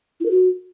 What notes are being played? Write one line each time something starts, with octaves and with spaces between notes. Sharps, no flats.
E4
A#4
F#4